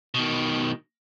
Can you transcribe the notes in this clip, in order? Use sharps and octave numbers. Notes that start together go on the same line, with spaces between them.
B2 D#3